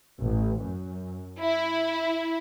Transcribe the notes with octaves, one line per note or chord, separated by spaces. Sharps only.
A1
F#2
E4